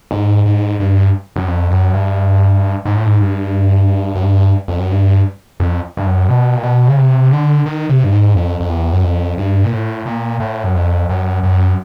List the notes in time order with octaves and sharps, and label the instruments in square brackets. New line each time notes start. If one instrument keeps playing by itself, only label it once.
[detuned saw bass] G#2
G#2
G2
F#2
F2
F#2
G2
G#2
A2
G#2
G2
F#2
G2
F2
F#2
G2
F2
G2
F#2
B2
A#2
B2
C#3
C3
D3
D#3
C3
G2
G#2
F2
F2
E2
F#2
F2
G2
A#2
A2
A#2
A2
F#2
F2
F#2
F#2